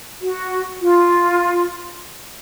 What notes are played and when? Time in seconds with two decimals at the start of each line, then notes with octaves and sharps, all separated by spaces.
0.21 F#4
0.80 F4